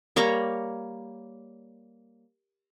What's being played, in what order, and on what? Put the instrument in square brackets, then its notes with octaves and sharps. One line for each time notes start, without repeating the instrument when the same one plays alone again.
[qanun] G3 A#3 C#5 A#5